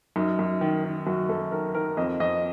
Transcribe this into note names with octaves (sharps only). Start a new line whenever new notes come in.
F#2 D#4
F#2
D#3
D#3
F#2 F#4
F#2 A4
D#3 A#4
D#3 A#4
F2 D#5
F2 D#5